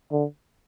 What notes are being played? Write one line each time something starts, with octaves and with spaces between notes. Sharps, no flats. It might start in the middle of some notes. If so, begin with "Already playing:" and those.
D3